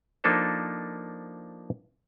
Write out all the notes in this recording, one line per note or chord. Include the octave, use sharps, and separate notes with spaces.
F3 A#3 D4 D#4 A4 C5